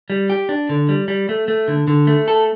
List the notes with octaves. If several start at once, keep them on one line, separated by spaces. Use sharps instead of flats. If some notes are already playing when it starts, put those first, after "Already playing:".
G3
G4
D4
D3
G3
G3
A3
A3
D3
D3
A3
A4